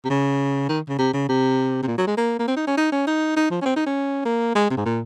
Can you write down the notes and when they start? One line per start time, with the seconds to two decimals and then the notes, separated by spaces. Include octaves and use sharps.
0.05 C3
0.10 C#3
0.69 D#3
0.89 C#3
0.98 C3
1.13 C#3
1.29 C3
1.83 C3
1.87 A#2
1.98 F#3
2.07 G#3
2.17 A#3
2.39 A#3
2.48 C4
2.57 D#4
2.67 C#4
2.77 D#4
2.92 C#4
3.07 D#4
3.36 D#4
3.51 F3
3.61 C#4
3.65 C4
3.76 D#4
3.86 C#4
4.25 A#3
4.55 G#3
4.70 C3
4.77 G#2
4.85 A#2